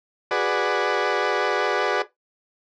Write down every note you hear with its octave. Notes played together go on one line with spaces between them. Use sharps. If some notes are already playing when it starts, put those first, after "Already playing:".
F#4 G#4 B4 D5